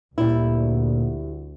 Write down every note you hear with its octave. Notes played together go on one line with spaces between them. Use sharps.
D2 A#2 G3 E4